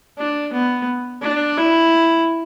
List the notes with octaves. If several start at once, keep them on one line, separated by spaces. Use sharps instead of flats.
D4
B3
D4
E4